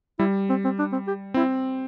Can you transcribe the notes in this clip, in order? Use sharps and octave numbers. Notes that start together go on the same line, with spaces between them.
G3 E4
C4
C4
D4
C4
G4
C4 E4